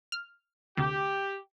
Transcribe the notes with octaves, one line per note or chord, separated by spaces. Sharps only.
F6
D2 C3 G4